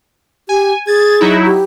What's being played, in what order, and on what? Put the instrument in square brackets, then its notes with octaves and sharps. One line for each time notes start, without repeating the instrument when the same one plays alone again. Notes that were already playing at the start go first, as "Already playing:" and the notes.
[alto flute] G4 [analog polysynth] G#5
[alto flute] G#4 [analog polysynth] G#6 A6
[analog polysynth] F#3 D#4 E4
[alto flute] G4